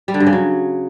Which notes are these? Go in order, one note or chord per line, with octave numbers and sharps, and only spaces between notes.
G3
D3
G2
C#3
F#3